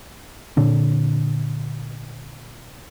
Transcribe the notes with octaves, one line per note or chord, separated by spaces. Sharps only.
A#2 D3 D4